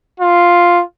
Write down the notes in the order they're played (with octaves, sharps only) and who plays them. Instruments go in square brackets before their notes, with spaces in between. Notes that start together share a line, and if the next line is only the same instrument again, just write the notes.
[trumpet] F4